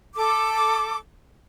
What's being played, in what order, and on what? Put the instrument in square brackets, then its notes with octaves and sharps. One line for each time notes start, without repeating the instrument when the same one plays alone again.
[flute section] A4 D6